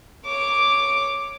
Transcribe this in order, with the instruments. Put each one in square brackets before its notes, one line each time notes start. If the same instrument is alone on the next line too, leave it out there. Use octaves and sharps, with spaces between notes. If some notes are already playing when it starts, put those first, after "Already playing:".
[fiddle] C#5 D6